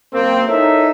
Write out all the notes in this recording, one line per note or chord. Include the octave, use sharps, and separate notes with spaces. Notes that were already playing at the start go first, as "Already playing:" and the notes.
F#2 A#3 C4
D#4 E4 A4 A#4 C#5 E5